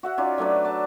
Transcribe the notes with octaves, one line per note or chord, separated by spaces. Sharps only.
F#4 E5 F#5
C#4 D#4 F4 D5
F#3 A3 D4 B4
D5 A5